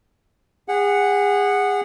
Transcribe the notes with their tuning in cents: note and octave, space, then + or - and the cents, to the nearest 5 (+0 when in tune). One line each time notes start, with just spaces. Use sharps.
G#4 -30 F#5 +0